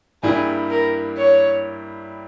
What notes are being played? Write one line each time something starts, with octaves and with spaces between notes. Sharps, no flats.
G2 G3 A#3 E4 G#4
A#4
C#5